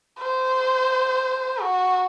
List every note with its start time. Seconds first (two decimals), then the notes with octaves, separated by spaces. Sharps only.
0.19 C5
1.62 F#4